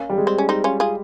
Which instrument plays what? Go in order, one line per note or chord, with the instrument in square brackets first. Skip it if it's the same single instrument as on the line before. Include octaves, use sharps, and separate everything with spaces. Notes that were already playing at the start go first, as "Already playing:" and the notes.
Already playing: [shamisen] A#3 C#4
[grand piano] G3
G#3
[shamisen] C4
C#4
C4 D#4
C#4 F4
F4 G#4